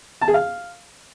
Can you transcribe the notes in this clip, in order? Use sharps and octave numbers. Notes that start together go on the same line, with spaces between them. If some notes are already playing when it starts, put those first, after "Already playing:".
A5
G#4
F5